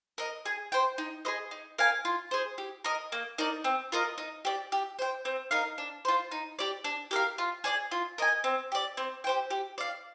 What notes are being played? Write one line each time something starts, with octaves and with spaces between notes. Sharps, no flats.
A#4 D#5
G#4
C5 G5
D#4
G#4 C5 D#5
D#4
A#4 F5 G#5
F4
G#4 C5
G4
A#4 D#5
A#3
D#4 A#4 D5
C4
F4 A#4 D#5
D#4
G4 D5
G4
C5 G5
C4
D#4 A#4 F5
D4
F4 C5
D#4
G4 D5
D4
G4 A#4 F5
F4
G#4 D5 G#5
F4
A#4 D#5 G#5
C4
G4 D5
C4
G4 C5 G5
G4
D5 F5